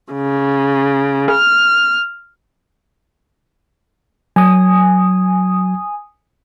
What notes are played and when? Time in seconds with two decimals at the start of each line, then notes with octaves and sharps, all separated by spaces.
0.13 C#3
1.30 F6
4.36 F#3 G#5 D#6